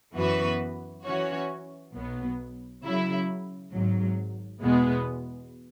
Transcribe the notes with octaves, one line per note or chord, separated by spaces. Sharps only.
F#2 E3 B3 F#4 B4
E3 C#4 F#4 C#5
B1 B2 F#3 B3
C#3 F#3 E4
G#1 G#2 F#3
E2 B2 G#3 B3